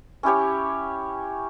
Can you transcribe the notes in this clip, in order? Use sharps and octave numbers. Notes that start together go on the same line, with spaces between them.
C#4 E4 G4 C#5